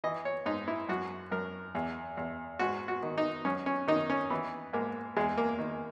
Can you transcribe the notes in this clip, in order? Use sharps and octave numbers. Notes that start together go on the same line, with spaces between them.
E3 D#5
C#5
G#2 D#4
E4
F#2 F#4
F#2 A#4
E2
E2
G#2 F#4
F#4
D#3
D#4
F#2 C#4
C#4
D#3 D#4
C#4
E3 B3
G#2 A#3
E2 G#3
A#3
D#3